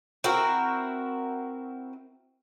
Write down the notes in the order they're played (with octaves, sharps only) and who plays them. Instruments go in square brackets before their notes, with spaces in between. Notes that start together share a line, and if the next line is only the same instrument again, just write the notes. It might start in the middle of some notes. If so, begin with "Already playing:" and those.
[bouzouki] C4 E4 F#4 A#4